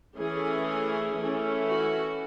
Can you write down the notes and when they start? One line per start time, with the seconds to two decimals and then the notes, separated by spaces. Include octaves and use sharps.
0.17 E3 A3 C#4 G#4
1.17 E3 A3 C#4
1.69 F#4